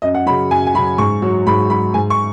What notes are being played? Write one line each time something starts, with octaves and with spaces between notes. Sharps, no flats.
F#2 D#5
F#5
C#3 F#3 B5
F#2 G#5
G#5
C#3 F#3 B5
G#2 C#6
F#3
G#2 B5
F#3 B5
G#2 G#5
C#6